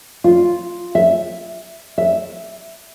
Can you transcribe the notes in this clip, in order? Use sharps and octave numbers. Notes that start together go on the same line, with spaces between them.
F4
E5
E5